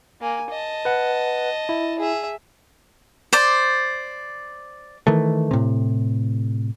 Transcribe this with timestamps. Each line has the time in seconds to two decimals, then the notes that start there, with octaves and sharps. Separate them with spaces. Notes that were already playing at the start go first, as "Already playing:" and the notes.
0.21 A#3 G#5
0.51 D#5 A5
0.85 B4 F#5
1.69 E4
1.99 G#4 E5
3.33 C5 D5
5.07 D#3 E3 A3
5.51 A2 C3